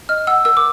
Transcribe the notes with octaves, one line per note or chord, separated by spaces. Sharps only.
D#5 F6
F#5 E6
A#4 E6
D6